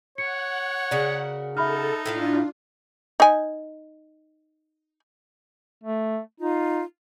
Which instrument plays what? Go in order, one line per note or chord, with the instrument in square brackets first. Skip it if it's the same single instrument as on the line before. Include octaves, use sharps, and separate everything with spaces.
[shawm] C#5 [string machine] F#5 [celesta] C#7
[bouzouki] C#3 F#4 A#4 [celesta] D5
[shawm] D#4 [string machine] A4 [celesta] E5 B5 F6
[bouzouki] A2 E4 F5 [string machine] D4 F4
[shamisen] D#4 G#5
[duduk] A3
[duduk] D#4 [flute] F4